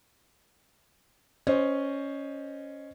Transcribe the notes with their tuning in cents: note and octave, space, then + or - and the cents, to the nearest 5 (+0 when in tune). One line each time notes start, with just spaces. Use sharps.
C#4 +0 C5 +0 D#5 -20